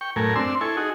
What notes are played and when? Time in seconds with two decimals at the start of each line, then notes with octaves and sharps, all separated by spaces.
0.01 G5 C#6
0.16 F#2 A2 A3 A#4 G#5
0.36 C4 D4 C6 E6
0.61 E4 A4 G#5 C#6
0.77 D#4 F#4 G#4